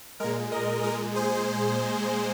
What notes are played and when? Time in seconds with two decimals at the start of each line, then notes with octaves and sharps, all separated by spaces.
0.20 A#2 G#3 A#4
0.52 A#4 D#5
0.83 A#2 G#3 A#4 D#5
1.15 G#4 C5